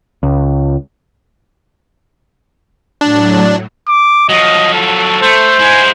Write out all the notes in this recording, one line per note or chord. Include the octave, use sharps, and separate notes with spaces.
C#2
A2 F#3 D4
D6
F3 F#3 D#5
A4
A3 C5
G#3 E4 G#5